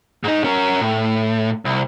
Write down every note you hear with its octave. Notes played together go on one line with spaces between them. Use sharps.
G#2 D#4
C#4 A#4
A2
C2